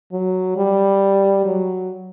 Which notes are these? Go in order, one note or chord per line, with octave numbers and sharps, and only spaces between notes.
F#3
G3
F#3